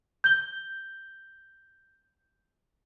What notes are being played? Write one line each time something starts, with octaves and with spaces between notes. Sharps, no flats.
G6 G7